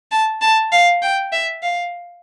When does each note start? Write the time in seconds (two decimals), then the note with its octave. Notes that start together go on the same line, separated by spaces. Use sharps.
0.12 A5
0.41 A5
0.72 F5
1.02 G5
1.32 E5
1.63 F5